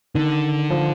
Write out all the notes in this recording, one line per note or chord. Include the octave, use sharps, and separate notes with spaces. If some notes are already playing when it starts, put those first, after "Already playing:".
D3 D#3
F3